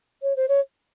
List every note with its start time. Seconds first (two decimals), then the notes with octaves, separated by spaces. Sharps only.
0.22 C#5
0.36 C5
0.49 C#5